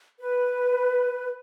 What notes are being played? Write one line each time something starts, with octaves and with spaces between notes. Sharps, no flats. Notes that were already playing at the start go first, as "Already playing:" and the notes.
B4